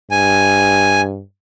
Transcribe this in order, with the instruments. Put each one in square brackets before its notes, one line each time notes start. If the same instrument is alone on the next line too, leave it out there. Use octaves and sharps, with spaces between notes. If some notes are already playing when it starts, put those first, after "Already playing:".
[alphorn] G2 [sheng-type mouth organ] G#5